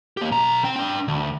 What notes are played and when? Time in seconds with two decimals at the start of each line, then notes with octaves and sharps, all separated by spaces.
0.17 A#3 G4
0.31 B1 A#5
0.64 C4 G5
0.76 D4 G5
1.08 D2